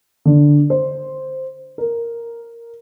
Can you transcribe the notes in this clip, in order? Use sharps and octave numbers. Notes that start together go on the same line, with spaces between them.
D3
C5
A#4